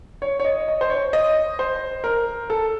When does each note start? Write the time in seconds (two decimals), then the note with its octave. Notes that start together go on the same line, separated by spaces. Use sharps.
0.22 C#5
0.40 C#5
0.45 D#5
0.68 D#5
0.81 C5
0.90 C#5
1.13 D#5
1.59 C5
2.04 A#4
2.50 A4